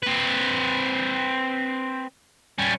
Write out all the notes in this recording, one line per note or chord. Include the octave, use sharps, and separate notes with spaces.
C4 B4
G3 C#4